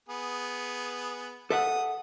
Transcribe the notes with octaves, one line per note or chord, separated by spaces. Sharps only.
B3 G#4
A4 E5 F#5 D#6